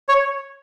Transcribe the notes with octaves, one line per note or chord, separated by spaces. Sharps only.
C#5